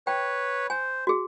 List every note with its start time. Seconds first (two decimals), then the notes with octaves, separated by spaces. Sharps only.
0.07 B4 C#5 G5
0.70 C5 G#5
1.07 F#4 G#4